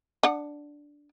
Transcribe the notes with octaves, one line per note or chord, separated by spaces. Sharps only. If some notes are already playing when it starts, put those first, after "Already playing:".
D4 F#5